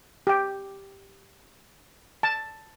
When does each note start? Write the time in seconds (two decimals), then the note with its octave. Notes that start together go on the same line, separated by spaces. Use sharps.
0.27 G4 G5
2.23 A5